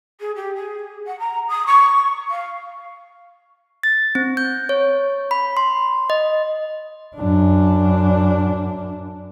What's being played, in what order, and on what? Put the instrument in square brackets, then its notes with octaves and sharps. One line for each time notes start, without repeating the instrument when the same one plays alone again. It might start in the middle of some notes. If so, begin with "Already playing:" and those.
[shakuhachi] G#4
G4
G#4
F#5
A#5
D#6
C#6
F5
[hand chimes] A6
C4
G6
C#5
B5
C6
D#5
[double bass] F#2 D4